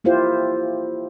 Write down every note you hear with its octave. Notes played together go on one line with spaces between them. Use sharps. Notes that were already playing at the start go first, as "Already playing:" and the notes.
A#3 E4 F4 G4 C5